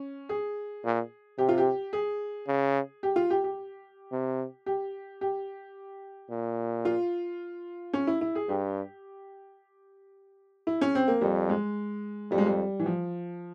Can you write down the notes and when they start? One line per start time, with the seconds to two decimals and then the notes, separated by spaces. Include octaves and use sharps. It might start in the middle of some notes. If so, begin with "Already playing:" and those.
Already playing: C#4
0.29 G#4
0.84 A#2
1.38 C3 G4
1.49 F4
1.58 G4
1.93 G#4
2.48 C#3
3.03 G4
3.16 F4
3.30 G4
3.44 G4
4.12 C3
4.66 G4
5.21 G4
6.30 A#2
6.85 F4
7.93 C#4
8.07 E4
8.21 E4
8.35 G#4
8.49 G2 G4
10.67 E4
10.81 C#4
10.95 C4
11.08 A#3
11.21 F2 G3
11.49 G#3
12.31 F2 G3
12.38 G#3
12.46 G3
12.80 E3
12.86 F3